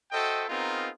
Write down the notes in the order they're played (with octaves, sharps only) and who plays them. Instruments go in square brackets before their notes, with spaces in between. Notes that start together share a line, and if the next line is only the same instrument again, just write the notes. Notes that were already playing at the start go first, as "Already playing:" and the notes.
[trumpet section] F#4 A4 C5 D#5 E5 G5
B3 C4 D#4 F4 G#4 A#4